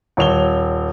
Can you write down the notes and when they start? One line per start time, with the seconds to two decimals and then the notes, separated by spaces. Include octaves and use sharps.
0.17 D#1 C#5 F7 G7